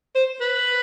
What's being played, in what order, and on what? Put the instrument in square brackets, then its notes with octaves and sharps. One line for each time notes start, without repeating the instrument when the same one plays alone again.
[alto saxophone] C5
B4